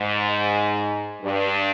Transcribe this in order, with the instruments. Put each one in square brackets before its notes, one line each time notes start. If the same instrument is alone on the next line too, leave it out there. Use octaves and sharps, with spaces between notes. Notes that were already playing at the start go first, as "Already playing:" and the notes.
Already playing: [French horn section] G#2
G2